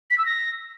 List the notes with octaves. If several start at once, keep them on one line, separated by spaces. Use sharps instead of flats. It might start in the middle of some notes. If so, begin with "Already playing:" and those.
B6
E6
A#6